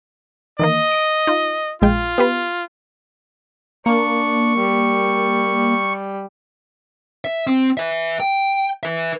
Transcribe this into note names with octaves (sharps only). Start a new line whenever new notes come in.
D#3 E3 A#3 D#5
D7
D#4 F4
A#1 G#3 F4 G5
B3 G4 B4
A#3 D4 C#6
G3
E5
C4
B4 E5
G5
B4 E5